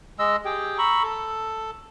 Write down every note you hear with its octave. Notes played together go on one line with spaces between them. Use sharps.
G#3 D#5 E6
G4 G#4 G5
A#5 B5 C#6 E6
A4